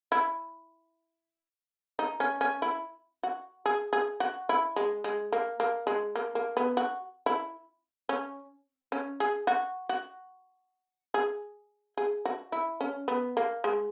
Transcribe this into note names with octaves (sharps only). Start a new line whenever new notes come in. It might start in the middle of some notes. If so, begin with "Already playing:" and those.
E4
D#4
C#4
C#4
E4
F#4
G#4
G#4
F#4
E4
G#3
G#3
A#3
A#3
G#3
A#3
A#3
B3
F#4
E4
C#4
C#4
G#4
F#4
F#4
G#4
G#4
F#4
E4
C#4
B3
A#3
G#3